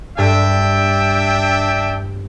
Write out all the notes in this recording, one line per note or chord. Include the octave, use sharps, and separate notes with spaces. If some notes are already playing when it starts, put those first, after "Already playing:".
G2 D4 E5 G5